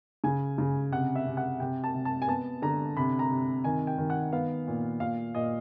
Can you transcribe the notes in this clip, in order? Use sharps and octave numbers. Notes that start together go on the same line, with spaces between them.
C#3 G#5
C#3
C3 F#5
E5
C3
F#5
C3 G5
A5
C3
A5
G#5
B3 A5
D3 A#5
C3 B5
A#5
C3
D#3 G#5
G5
D#3
F#5
B3 F5
A#2
A#2 F5
A#2 D#5